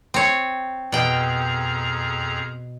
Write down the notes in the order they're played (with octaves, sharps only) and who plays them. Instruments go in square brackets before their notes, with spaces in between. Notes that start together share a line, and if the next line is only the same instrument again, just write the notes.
[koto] C4 C#5
[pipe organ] F2 G#4 A#5 [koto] B2 G5